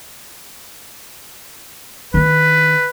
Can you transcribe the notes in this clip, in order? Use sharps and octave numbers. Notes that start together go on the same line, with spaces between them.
D#3 D4 B4